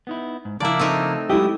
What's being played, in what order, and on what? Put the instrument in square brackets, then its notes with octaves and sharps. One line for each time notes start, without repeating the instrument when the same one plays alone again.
[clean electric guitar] B3 D#4 E4
G#2
[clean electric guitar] C#3 F3 F5 [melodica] A#3 D4 [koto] E4 D5
[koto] A3 C4 D#4
[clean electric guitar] F#3 G#3 F#4 [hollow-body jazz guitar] E4 G4 [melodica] E5 D#6